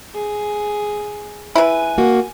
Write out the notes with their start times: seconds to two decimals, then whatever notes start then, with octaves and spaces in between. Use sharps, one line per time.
0.15 G#4
1.55 E4 B4 G#5
1.98 A#3 F#4